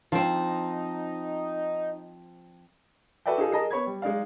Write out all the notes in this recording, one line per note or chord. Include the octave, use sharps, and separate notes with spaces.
F3 C4 D#4
F#4 A4 B4 D5 E5 G5
D#4 F4 G#4 A4
G#4 A#4 D#5 A5 A#5
B3 C#5 B5 G#6
G3
G#3 D#4 D5 F5